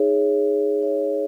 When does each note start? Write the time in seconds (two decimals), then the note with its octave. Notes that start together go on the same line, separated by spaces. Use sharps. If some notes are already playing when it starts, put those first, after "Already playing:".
Already playing: D#4 G#4 C#5 E5
0.81 D#4 G#4 C#5 E5